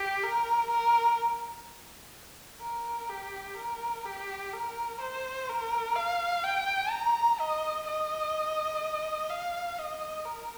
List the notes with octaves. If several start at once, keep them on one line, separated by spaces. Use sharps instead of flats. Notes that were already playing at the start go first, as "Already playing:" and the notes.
Already playing: G4
A#4
A#4
A#4
G4
A#4
G4
A#4
C5
A#4
F5
G5
A#5
D#5
D#5
F5
D#5
A#4